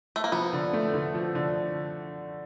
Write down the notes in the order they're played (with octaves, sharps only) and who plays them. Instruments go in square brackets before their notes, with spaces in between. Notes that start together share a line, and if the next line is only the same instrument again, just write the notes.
[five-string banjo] A3
A#3
[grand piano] F3 [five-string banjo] B3
[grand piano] D3
A3
D3
F3
D3